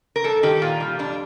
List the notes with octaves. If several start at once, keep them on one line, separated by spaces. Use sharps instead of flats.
A#4
G2 A4
D#3 G4
A#2 F4
G3
F2 D4